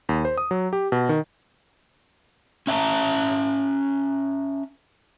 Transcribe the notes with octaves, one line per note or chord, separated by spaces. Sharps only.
D#2
C5
D#6
F#3
G4
B2
D#3
C#4 E5 G5 A5 A#5